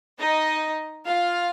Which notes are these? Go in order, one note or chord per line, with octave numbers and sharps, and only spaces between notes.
D#4 D#5
F4 F5